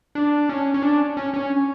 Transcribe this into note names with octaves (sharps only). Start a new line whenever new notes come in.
D4
C#4
C#4
D4
C#4
C#4